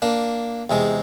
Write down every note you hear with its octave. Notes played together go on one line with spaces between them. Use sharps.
A#3 D4
E2 C3 G#3